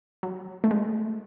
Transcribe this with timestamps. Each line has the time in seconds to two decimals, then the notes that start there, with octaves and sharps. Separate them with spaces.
0.23 F#3
0.64 A3
0.71 G#3